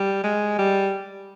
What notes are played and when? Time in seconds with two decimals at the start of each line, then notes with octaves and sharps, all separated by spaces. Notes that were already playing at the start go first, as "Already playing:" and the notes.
Already playing: G3
0.24 G#3
0.58 G3